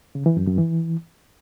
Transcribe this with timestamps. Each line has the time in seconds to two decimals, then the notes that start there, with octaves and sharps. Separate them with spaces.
0.15 C#3
0.26 E3
0.37 F#2
0.47 F#2
0.58 E3